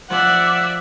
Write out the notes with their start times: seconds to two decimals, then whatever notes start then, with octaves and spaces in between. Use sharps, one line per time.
0.10 F3 D5 E5 F#5